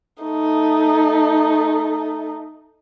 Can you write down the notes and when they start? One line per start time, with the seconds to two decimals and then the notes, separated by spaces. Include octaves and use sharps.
0.23 A3 D#4